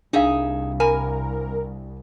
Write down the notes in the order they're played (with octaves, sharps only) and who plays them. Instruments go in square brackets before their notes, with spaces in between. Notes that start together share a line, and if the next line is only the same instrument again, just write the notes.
[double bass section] C2 [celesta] D4 F5 [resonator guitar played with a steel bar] D#4 G#4 E5
[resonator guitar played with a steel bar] G3 G#5 [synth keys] A#4